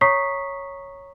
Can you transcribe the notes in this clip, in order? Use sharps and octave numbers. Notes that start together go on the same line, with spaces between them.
C#5 A#5 C#6 D#6 B6 C7